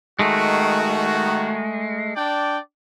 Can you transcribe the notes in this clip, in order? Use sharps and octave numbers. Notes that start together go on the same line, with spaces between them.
D#3 G#3 A3 F#4
D4 D5 G5